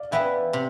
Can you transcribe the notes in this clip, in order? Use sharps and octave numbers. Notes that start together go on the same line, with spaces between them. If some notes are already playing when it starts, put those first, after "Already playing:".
Already playing: D5 F5
E3 B3 E4 B4 E5 G5
C3